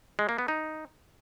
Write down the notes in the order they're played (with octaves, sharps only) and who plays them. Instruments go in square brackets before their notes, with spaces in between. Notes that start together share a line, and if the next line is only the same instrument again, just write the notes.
[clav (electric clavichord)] G#3
A#3
B3
D#4